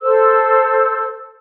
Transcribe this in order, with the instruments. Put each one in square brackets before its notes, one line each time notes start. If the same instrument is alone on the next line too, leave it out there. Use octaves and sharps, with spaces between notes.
[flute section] A4 C5 E6